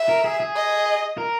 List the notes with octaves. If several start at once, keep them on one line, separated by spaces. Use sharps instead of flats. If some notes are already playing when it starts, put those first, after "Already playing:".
Already playing: E5
A#4
G#4
G#4
D#5
A#4